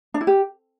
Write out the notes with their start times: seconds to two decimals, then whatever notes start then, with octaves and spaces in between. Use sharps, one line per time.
0.14 D4
0.21 E4
0.27 G4